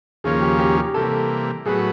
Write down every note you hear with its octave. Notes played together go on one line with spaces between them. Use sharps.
D#2 C#3 F3 A#3 C#4 G#4
G4
G4
G4
C3 E3 G3 A#3 A4
A2 F#3 B3 G#4